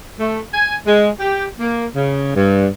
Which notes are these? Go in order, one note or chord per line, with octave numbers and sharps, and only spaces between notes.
A3
G#5
G#3
G4
A#3
C#3
G2